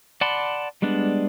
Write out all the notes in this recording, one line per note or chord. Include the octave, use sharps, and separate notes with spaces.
D5 F#5 A5 B5 C6
G3 G#3 B3 D4